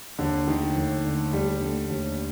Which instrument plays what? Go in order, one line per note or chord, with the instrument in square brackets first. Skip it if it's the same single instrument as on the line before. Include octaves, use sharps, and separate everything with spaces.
[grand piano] D#2 [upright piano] D3
[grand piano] D3 A3 [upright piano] D#3
[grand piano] D#2
D3 A3
[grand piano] D#2 [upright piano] G3
[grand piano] D3 A3
D#2